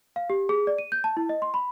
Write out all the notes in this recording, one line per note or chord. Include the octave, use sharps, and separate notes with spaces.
F5
G4
G#4
D5
D#7
G6
A5
E4
D#5
C6
B5